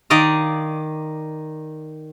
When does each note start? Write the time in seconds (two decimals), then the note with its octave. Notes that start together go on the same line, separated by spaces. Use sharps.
0.10 D#3 D5 D#5 F5